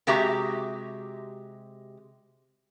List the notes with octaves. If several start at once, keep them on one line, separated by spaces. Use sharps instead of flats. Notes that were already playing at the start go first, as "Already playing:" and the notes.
C3 G#3 F#4 G4 E5 A#5